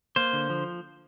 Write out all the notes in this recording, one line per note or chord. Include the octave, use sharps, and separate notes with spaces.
A#3 C5
D3
F3